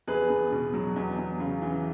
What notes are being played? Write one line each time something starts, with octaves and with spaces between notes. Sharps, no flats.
E2 G#4 B4
E2
B2
F#3
E2
E2
C#3
E3